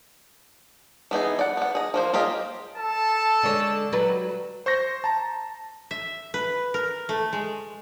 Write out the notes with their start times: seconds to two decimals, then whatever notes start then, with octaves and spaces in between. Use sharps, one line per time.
1.11 E3 B3 D#4 G#4
1.39 D5 F#5
1.57 B3 F#5
1.75 G#4 D#5
1.94 F3 A#3 C5
2.13 A#3 F4 G4 G#4 D#5
2.76 A4 A5
3.43 D3 G#3 C#5
3.93 F#3 G3 B4
4.66 C5 C#6 G6 A#6
5.04 A5 A#5
5.91 E5
6.34 B4
6.74 A#4
7.09 A3
7.33 G#3